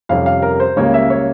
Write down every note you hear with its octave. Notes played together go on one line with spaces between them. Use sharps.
F2 C3 G3 C#4 F5
F5
A#4
C5
C#2 C#3 G3 A#3 C#5
E5
C#5